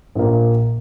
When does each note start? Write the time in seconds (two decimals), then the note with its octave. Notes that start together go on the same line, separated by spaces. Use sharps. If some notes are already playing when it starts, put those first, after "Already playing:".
0.15 A#1 A#2 A#3